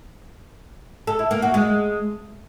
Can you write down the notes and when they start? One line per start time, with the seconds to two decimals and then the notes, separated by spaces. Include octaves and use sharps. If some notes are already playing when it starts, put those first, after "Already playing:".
1.07 A4
1.19 E4
1.31 A#3
1.42 F#4
1.54 G#3